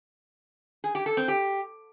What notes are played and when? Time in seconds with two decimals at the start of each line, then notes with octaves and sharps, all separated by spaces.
0.84 G#4
0.95 G4
1.06 A4
1.17 C4
1.28 G4